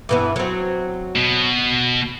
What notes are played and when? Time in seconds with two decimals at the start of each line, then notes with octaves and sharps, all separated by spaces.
0.09 G2 E3 B3
0.36 F#3 C4
1.16 B2